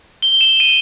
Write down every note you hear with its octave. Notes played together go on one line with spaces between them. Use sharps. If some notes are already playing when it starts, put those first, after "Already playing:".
G7
E7
D#7